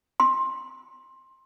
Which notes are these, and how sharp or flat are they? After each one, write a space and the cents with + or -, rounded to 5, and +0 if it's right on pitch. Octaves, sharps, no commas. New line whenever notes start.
C6 +15